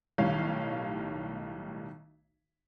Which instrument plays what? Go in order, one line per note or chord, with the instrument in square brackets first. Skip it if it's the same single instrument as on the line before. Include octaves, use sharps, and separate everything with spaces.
[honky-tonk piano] B1 A2 D#3 G3 C#5 F5